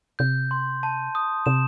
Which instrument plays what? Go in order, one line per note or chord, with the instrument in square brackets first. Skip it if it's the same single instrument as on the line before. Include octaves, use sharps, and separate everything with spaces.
[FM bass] C3 [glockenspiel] G6
[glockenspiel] C6
A5
D#6
[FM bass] C3 [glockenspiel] E7